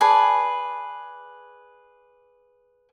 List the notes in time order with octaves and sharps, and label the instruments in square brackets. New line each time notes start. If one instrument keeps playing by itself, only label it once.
[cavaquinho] G#4 B4 D5 A5